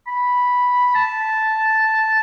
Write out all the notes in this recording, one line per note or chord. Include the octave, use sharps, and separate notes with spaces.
B5
A5